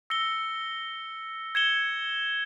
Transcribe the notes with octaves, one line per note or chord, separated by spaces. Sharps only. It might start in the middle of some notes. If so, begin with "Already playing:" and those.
E6 A#6 C#7 G7
G#6 C#7 E7 G7